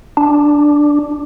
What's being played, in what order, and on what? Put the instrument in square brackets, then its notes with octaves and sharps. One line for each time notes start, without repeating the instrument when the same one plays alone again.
[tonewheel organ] D4